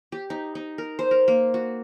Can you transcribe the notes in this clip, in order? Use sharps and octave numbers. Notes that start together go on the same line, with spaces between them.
G4
D#4
D#4
A#4
C5
A#4
A#3
F#4